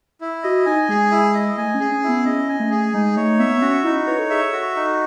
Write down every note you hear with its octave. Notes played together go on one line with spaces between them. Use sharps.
E4
F#4 D#5
D#4 G#5
G#3 G#4
E4
D#5
A3 G#5
C#4
G#4
C#4
E4
B3
C#4 D#5
G#5
A3
G#4
G#3 D#4
A3 C#5
B3 E5
B3
C#4 F#4
D#4 E4
B4 C#5
A4
G#4 E5
A4
F#4
D#4